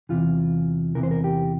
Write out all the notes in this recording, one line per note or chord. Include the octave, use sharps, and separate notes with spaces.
E2 C3 E3 F4
E2 C3 E3 A#4
C5
A#4
G4